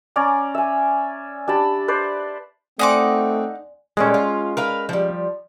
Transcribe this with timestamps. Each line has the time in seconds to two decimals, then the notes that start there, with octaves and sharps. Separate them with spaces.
0.16 C#4 D5 A#5 D6
0.55 E5 G#5
1.48 D4 G4 A5 B5
1.88 B4 C5 D5
2.79 A3 C4 D#4 D5 F#5 G#5 C6 D6
3.97 A#2 G3 G#3 C#4 A4
4.14 F4
4.57 A#4 B4 F5
4.89 F3 G3